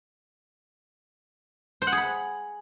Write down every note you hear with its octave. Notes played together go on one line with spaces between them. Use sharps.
C5
F#5
G#4
B5